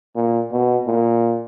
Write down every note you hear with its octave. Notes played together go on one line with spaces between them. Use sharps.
A#2
B2
A#2